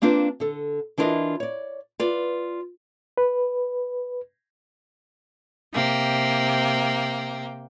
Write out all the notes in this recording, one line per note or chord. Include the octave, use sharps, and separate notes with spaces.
A#3 C4 D4 F4 B4 C5
D3 A4
E3 D4 E4 F4 A#4 D#5
C#5 D5
F4 B4 D5
B4
C3 A#3 G5